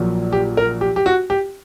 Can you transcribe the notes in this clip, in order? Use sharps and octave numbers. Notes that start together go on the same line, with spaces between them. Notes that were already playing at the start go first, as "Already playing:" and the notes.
Already playing: A#1 A#2 F#3
G4
A#4
G4
G4
F#4
G4